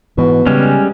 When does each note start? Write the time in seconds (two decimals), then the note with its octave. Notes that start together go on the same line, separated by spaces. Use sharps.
0.18 G#2 B2 E3
0.46 C#3 G3 G#3 C#4